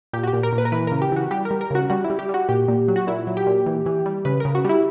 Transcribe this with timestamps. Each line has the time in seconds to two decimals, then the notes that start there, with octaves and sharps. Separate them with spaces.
0.13 A#2 G4
0.23 F#4
0.27 G4
0.33 A#2
0.43 A#4
0.53 A#2
0.58 B4
0.65 A#4
0.72 E3 B4
0.87 C#3 A#4
1.02 G4
1.12 E3 F#4
1.31 G3 G4
1.45 A#4
1.51 G3
1.61 A#4
1.71 C#3 F#4
1.90 G3 F#4
2.04 E4
2.10 G3
2.19 G4
2.29 G3 F#4
2.49 A#2 G4
2.68 A#2
2.88 F#3
2.96 F#4
3.07 A#2 E4
3.27 F#3
3.37 G4
3.47 A#2
3.66 E3
3.86 E3
4.06 G3
4.25 C#3 B4
4.40 C#3 A#4
4.55 F#4
4.65 G3 E4